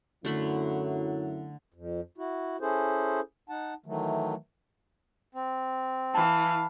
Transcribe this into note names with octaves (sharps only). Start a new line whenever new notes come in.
F#2 D3 F#3 A3 E4 B5
F2
E4 F#4
C#4 E4 G#4 A4 C5
D#4 F#5 A5
D#3 E3 F#3 A3
C4
E3 F5 A5 B5